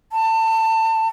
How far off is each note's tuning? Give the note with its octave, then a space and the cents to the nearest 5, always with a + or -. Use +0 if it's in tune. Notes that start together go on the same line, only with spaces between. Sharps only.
A5 +25